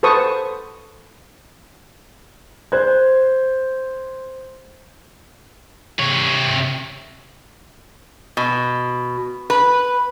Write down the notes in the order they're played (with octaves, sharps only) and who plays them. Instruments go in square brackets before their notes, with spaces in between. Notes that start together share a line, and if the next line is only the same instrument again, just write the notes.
[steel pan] A4 B4 C5 A5 C#6 D#6
[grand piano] C5 F#6 G#6
[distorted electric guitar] C3 C#5
[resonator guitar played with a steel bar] B2
B4